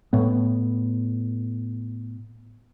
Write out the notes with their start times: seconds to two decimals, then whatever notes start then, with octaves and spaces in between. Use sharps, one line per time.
0.13 A2 B3